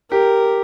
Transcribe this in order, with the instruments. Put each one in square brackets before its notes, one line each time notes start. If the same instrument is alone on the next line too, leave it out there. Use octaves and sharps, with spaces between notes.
[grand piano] G4 [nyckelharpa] A#4